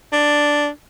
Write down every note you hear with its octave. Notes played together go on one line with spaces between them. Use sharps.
D4